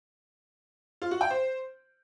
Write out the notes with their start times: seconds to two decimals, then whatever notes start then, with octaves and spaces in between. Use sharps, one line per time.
1.02 F4
1.11 F#4
1.21 G5
1.30 C5